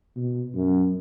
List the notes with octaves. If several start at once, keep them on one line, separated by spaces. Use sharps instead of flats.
B2
F#2